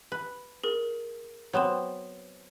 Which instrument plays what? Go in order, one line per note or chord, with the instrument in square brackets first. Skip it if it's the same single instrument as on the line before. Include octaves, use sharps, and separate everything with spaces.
[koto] B4
[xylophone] G#4 A#4
[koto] F#3 B3 C4 [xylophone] C5 E7